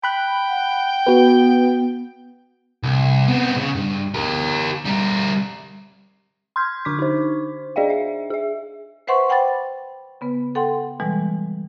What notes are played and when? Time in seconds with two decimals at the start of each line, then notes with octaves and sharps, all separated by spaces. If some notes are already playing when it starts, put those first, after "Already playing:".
0.04 G5 B5 F#6
0.49 F#5
1.06 B3 F#4 B4
2.84 C2
3.28 B3 C4
3.56 A2 C#3
3.75 G2
4.14 G4 A#4
4.86 G3 A#4
6.56 C6 F6 G6 G#6
6.85 D3 D4 C#6 D6 B6
6.99 D#4 C5
7.76 D4 G#4 D5 D#5 F5 G5
7.90 E5
8.30 G#4 E5
9.07 B4 C5 E5 F#5 C6 C#6
9.29 C5 F#5 G5 B5 D6 A6
10.21 C#3 B3 B4
10.55 A4 F#5 G5 C6
11.00 B2 E3 G3 G#3